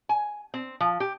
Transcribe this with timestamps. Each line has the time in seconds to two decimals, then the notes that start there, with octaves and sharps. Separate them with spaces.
0.09 G#5
0.54 C4
0.80 F3
1.00 G4